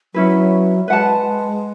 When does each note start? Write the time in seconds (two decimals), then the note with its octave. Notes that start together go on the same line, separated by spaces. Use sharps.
0.14 F#3 C#4 E4 B4
0.88 G#3 B4 F#5 A5